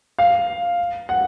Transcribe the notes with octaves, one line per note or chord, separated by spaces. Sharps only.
F5
F#5